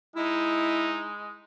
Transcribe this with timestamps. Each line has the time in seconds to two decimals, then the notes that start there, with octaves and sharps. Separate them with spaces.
0.16 G#3 D#4 E4